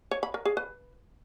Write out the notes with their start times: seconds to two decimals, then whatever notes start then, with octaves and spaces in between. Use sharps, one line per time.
0.11 C#5
0.23 B5
0.34 A#4
0.45 G#4
0.57 B4